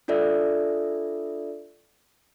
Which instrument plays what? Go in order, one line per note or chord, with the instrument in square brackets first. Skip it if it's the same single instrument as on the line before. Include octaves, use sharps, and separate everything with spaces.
[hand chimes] D4 F4 A4 D5 E5